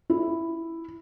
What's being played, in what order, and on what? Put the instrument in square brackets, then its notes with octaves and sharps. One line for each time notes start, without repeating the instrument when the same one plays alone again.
[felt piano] E4